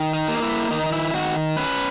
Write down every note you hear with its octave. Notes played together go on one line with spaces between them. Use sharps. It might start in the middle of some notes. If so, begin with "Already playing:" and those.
Already playing: D#3
D#4
A#3
D#4
E4
D#3 D#4
D#4
E4
D#3 F#4
C#4 B4